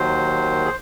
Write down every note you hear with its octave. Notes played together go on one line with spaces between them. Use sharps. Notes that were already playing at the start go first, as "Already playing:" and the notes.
Already playing: D#2 D#3 F#3 C5
G#4